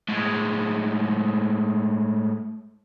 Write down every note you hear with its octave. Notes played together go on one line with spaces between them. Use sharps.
A2 G#3